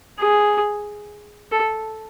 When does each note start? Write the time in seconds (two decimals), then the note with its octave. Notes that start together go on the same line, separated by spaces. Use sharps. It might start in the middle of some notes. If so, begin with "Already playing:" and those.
0.20 G#4
1.52 A4